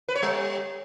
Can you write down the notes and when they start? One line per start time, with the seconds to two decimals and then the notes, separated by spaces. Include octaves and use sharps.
0.08 B4
0.16 C#5
0.23 G3